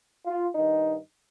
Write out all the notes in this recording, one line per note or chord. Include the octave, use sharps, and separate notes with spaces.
F4
G2 D#3 D#4